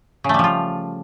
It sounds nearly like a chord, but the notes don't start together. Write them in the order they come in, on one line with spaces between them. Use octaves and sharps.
C#3 A3 G3 F3 F4